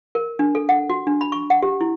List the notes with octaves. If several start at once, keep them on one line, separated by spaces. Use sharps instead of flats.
A#4
D4
A4
F#5
F#4
D4
B5
C#6
F#5
G4
E4